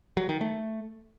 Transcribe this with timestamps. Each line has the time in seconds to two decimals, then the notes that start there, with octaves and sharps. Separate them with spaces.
0.17 F#3
0.29 D#3
0.41 A3